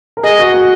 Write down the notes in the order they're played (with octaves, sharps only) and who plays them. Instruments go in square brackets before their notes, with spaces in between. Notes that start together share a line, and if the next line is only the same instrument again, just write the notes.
[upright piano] A#4
[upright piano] G#4 [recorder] D#5
[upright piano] F#4
F#4